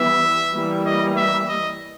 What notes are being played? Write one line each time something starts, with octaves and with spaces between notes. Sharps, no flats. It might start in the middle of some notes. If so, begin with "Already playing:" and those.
Already playing: E3 G3 B3 E5
E3 G3 A#3
D#5
E5
D#5